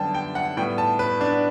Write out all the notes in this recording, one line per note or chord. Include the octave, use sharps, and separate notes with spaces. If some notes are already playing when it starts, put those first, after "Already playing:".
Already playing: F#2 D3 G3 B3 G5 A5
G5
F#5
A2 G3 B3 G5
A5
B4
D4